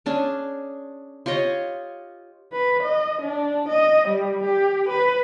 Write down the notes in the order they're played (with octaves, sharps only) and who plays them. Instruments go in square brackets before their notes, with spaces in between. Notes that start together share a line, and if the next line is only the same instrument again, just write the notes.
[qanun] C#4 D4 G#4
F4 G4 C#5 D#5
[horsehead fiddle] B4
D#5
D4
D#5
G3
G4
B4